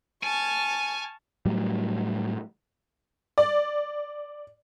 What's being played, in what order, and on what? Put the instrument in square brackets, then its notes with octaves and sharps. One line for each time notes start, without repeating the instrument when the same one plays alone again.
[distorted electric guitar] G#5 [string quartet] A5 C#6 F6
[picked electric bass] A2 F#3 G3
[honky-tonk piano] D5